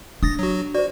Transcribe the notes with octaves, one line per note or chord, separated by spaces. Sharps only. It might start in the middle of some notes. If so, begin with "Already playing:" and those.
D4 D#6 A6 A#6
F#3 F#4
F#4 C5 D5